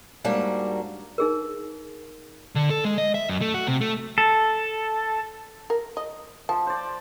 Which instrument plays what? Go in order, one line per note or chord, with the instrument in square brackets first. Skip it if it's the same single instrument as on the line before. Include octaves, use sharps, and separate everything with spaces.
[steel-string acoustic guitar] G#2 G3 A#3 D4 F#4
[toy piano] D#4 G#4 A#4
[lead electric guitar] D3
A4
G#3
D#5
E5
F#2
A3
F#4
C3
A3
[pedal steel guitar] A4
[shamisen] A#4
D#5
[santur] F3 [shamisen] A5
[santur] C5 D5